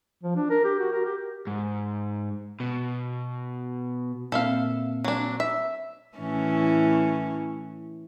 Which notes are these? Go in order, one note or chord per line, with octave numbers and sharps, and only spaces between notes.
F3
D4
A#4
G4
F#4
A#4
G4
G#2
B2
A#2 A#3 C4 A4 E5 F5
F#3 D4
E5
A2 E3 C#4